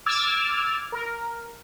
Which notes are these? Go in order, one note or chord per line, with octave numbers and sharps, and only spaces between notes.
D6 E6 F6 G#6 A6
A#4